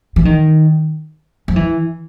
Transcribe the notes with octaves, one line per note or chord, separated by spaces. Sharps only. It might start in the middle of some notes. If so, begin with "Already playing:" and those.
E3
D#3
F3
E3